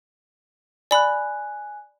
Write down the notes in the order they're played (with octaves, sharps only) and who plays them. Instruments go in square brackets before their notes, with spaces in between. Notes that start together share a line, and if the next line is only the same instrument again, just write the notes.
[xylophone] D5 B5 [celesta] G#5 F#6